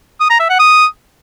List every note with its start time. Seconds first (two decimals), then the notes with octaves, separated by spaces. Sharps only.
0.20 D#6
0.30 A#5
0.40 E5
0.49 F#5
0.59 D#6